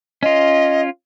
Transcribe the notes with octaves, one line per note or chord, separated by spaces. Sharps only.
C#4 F4 D#5